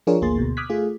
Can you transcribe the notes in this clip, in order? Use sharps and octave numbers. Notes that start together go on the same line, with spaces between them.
F3 D4 F4 G#4 A#4 C#5
G#1 D2 A#3 G#4 C6 A6
D2 B2
D6 D#6 F6 F#6 G#6 B6
A3 F4 G#4